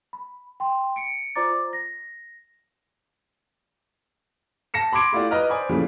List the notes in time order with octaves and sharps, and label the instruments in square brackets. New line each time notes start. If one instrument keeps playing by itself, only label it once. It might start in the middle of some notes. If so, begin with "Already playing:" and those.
[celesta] B5
G5 C6
C#7 D7
F4 C5 D5 A#5 D6 A6
A#6
[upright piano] A5 A#6 C#7 E7
B5 C6 D6 G#6 D7
A3 E4 F4 G4 D5 F#5
B4 D#5 A#5 F6
C5 D5 G#5 B5 D#6
A#2 C#3 E3 F3 G3 A3